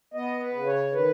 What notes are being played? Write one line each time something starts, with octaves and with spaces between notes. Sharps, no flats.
B3 D#5
B4
C#3
C#5
D#3 B4